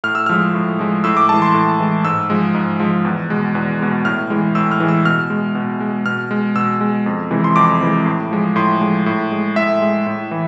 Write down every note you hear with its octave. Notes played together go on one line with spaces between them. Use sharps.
A2 F6
E6
F3 G#3 F6
A2
F3 G#3
A2 E6
D6
E3 G#3 A5
C6
A2
E3 G#3
G#2 E6
F3 G#3
G#2
F3 G#3
E2
B2 G#3
E2
B2 G#3
A2 F6
E3 G#3
A2 E6
F6
E3 G#3
E6
B2 F6
G#3
B2
G#3
B2 F6
G#3
B2 E6
G#3
F2
C3 E3 G#3
C6
F2 D6
C3 E3 G#3
A2
F3 G#3
A2 C6
F3 G#3
A2
G#3
A2 E5
G#3
A2
E3